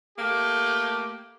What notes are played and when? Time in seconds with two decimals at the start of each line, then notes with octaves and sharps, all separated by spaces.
0.18 A3 A#3 G4